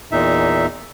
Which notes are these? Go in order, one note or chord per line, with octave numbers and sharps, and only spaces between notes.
E2 A#2 D#4 E5